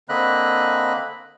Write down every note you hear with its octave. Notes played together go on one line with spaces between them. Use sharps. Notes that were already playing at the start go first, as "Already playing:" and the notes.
D3 A#3 C4 D#5 B5 F#6